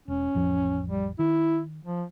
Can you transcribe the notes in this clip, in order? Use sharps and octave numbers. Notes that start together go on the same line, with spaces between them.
E1 C#4
A1 F2 F3
G3
D#3 E4
F3